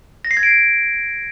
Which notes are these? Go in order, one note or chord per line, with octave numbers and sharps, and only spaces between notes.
A#6
C7
G#6
D7